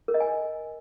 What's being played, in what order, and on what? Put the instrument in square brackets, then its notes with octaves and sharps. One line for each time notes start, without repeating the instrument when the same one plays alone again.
[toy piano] A#4
D#5
G#5